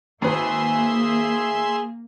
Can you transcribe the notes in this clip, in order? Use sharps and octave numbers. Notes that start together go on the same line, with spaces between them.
G#1 A#3 G#4 B4 E5 C6